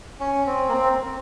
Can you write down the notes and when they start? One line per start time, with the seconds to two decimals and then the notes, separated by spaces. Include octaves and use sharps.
0.20 C#4
0.46 C4
0.68 A#3
0.73 C4